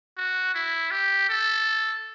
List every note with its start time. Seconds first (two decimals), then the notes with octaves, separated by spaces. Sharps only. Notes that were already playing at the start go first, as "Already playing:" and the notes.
0.17 F#4
0.55 E4
0.91 G4
1.29 A4